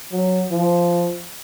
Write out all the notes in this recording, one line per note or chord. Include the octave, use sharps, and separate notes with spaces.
F#3
F3